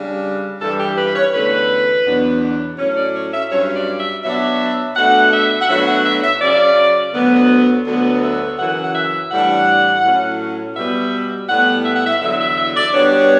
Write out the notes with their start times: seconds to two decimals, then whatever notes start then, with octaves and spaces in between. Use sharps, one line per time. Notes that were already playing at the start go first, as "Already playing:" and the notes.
Already playing: C#3 G3 D4
0.61 G2 E3 G3 A4
0.79 G4
0.98 B4
1.15 C#5
1.34 E2 D3 A3 C#4 B4
2.06 E2 B2 F#3 B3 D4
2.78 A2 F#3 C#4 C#5
2.97 D5
3.15 C#5
3.33 E5
3.51 G2 F#3 C#4 C#5
3.76 D5
4.00 E5
4.24 B2 F#3 B3 D4 E5
4.96 B2 A3 D4 F#5
5.33 E5
5.62 F#5
5.69 B2 F#3 A3 D4 E5
5.87 F#5
6.05 E5
6.24 E5
6.41 C#3 F#3 C#4 D5
7.14 D2 D3 F#3 B3
7.86 D2 D3 F#3 B3
8.23 E5
8.59 F#2 C#3 E3 F#5
8.84 F#5
8.95 E5
9.31 A2 E3 G3 D4 F#5
10.04 A2 F#3 C#4
10.76 B2 G3 B3 E5
11.49 A2 G3 B3 F#5
11.85 E5
11.95 F#5
12.06 E5
12.22 E2 D3 F#3 E5
12.40 E5
12.58 E5
12.77 D5
12.94 B2 G3 B3 D4 C#5